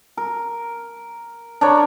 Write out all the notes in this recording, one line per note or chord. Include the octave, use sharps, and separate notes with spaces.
A#4
D4 A#4 C#5